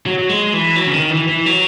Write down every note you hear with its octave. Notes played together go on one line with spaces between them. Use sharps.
F#3
F#3
G#3
E3
F#3
C#3
D#3
E3
E3
F#3